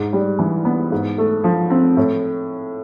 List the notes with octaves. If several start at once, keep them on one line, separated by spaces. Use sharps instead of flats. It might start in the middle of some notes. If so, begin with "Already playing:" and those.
Already playing: G#2
G3
E3
B3
G#2
A3
F3
C4
A2